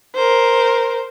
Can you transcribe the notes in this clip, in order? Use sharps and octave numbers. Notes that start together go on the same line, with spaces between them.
A#4 C5